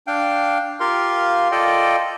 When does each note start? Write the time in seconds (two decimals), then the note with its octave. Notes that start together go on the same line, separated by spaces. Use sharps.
0.07 D4 F5 G5
0.80 F4 G4 A#4 F5 C6
1.52 F4 A4 D5 D#5 G5